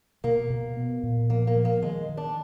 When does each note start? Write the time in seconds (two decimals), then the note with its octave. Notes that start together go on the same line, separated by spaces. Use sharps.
0.24 B2 A#3
0.50 B2
0.77 B3
1.03 A#2
1.30 F3 A#3
1.47 A#3
1.56 F3
1.65 A#3
1.82 D#3 G#3
2.09 D#3
2.17 D4